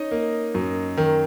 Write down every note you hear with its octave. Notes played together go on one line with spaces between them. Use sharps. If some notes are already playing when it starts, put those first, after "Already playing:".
Already playing: C#4 D#4 D#5
A#3
F#2
D#3